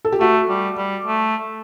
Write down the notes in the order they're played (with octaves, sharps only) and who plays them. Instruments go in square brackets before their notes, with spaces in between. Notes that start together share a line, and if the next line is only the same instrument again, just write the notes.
[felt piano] A4
G4
[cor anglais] A3 [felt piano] F#4
[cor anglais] G3
G3
A3